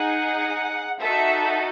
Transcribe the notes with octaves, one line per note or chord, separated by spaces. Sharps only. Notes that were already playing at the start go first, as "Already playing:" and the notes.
Already playing: D#4 G#4 F#5
D#4 F#4 A4 E5